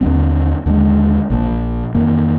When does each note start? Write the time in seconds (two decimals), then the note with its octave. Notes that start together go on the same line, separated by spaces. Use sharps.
0.01 D#2 D3 G#3 C4
0.66 D#2 D3 G#3
1.30 A#1 A#2 F3
1.94 F2 D#3 A#3